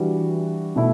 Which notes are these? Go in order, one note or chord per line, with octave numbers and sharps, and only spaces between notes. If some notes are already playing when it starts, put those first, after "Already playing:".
Already playing: E3 G3 D4 F#4
B2 A3 E4